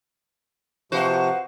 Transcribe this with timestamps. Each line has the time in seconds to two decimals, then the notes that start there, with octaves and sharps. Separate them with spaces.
0.92 C3 F3 F#4 B4 C5